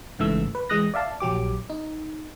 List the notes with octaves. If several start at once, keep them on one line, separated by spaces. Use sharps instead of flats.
G#1 G#2 C#3 E3 A3 E6
B4
E3 G#3 D#6 F#6 A#6
D5 E5 F5 A5
A#1 F#3 G4 D6
D#4